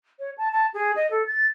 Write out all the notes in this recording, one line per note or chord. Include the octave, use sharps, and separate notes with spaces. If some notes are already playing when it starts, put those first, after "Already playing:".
C#5
A5
A5
G#4
D#5
A4
A6